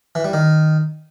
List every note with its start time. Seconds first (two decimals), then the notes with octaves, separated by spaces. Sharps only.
0.15 E3
0.24 G3
0.33 D#3